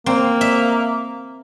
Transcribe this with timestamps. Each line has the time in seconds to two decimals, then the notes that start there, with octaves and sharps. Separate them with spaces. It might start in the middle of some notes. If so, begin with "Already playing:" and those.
0.06 A#3 C4
0.41 E5